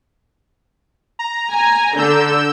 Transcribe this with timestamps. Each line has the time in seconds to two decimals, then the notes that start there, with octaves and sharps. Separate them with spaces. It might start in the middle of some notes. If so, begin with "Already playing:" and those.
1.19 A#5
1.52 G#5
1.97 D3 E6 G6